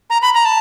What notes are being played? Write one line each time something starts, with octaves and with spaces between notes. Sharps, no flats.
A#5
B5
A#5
A5